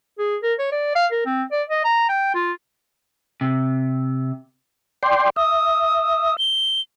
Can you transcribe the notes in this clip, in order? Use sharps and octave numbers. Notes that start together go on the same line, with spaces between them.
G#4
A#4
C#5
D5
F5
A#4
C4
D5
D#5
A#5
G5
F4
C3
D5 G5 C6
E5 D#6
G7